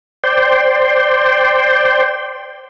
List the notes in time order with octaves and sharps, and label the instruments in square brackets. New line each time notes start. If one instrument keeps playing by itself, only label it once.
[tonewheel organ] C5 D5 G5 C6